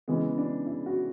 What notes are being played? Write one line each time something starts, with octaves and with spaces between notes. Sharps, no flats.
C#3 E3 G#3 B3
D4
E4
F#4